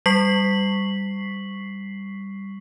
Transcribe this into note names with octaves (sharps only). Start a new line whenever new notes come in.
G3 C#6 B6 C7 F#7